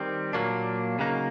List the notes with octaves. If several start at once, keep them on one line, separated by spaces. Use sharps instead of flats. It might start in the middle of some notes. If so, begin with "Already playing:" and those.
Already playing: D#3 G3 C4
A#2 F#3 A#3 D4
C#3 F#3 A#3 D#4